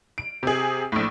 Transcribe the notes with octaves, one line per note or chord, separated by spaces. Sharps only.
D7
C3 G#4
A#1 A2